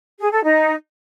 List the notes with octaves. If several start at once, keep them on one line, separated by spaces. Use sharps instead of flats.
G#4
A4
D#4